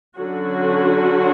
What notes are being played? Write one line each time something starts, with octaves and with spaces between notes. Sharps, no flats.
D3 F#3 C#4 F#4